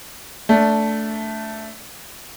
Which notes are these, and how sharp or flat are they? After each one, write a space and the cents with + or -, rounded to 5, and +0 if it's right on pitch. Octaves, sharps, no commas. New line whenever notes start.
A3 +0 D4 -20